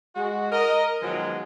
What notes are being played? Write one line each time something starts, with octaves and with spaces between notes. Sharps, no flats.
G#3 F#4
A#4 D#5
B2 D#3 F3 F#3 G#3